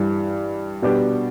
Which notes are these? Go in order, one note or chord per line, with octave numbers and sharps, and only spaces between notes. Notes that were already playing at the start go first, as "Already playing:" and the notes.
Already playing: G2 E3 G3
B2 G3 B3 D4 G4